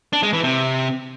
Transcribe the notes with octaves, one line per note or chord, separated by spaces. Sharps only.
D4
G#3
E3
C3